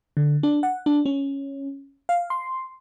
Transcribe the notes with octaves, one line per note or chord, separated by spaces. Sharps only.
D3
D4
F#5
D4
C#4
F5
C6